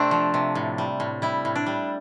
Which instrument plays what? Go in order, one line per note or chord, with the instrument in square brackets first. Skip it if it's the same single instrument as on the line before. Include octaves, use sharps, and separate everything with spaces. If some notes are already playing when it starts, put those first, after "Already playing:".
Already playing: [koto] C3 A3 C4 D4
F3
C3
A2
G3
A2
G3 E4
A2
D4
G3